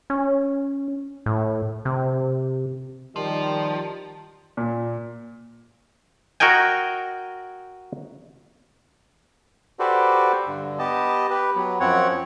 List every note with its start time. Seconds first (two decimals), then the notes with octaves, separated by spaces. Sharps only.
0.10 C#4
1.26 A2
1.85 C3
3.16 D#3 F3 G3
4.57 A#2
6.40 F#4 A#4 D#5 G5 G#5
9.79 F#4 G4 A4 B4 C5 D5
10.47 G2 D3
10.79 B3 G4 D#5 A5
11.30 G4 B4
11.56 F#3 B3
11.80 F#2 F3 C4 C#5 F#5